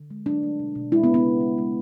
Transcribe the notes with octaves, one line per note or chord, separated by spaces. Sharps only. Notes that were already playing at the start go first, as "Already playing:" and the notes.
Already playing: D3
G#3
F#3 D4
A3
B2
B2
G#3 E4
B3
C#3
B3
C#3
G#3
G#3